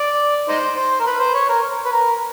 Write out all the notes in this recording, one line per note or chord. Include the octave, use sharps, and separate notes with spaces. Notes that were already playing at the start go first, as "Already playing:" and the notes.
Already playing: D5
D#4 C5
C5
A#4
B4
C5
C#5
A#4
B4
A#4